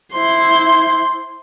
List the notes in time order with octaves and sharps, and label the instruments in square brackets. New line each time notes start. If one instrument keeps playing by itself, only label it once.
[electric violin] E4 C6 [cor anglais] C5